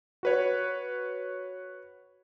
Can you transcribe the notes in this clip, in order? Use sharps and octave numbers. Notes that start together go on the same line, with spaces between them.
F#4 B4 C#5